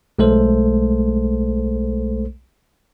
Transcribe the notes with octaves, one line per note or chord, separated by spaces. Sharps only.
B1 G#3 A3 A4 C5